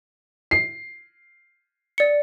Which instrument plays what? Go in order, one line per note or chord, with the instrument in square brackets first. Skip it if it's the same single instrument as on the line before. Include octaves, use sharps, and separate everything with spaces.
[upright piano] C7
[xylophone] D5 C#7